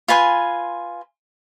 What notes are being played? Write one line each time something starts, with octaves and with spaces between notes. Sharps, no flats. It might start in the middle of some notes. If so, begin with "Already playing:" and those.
F4 B4 G#5 C6